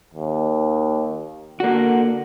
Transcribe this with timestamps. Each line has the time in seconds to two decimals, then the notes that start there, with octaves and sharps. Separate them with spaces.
0.14 D#2
1.60 D3 A#3 F#4